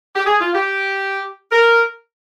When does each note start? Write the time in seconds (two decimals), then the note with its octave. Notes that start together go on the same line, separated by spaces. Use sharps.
0.15 G4
0.26 G#4
0.41 F4
0.54 G4
1.51 A#4